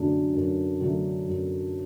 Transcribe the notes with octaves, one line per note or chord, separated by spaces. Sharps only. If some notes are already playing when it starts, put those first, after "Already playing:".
Already playing: F#2 D3 F#3 A3 D4
F#2
D3 F#3 A3 D4
F#2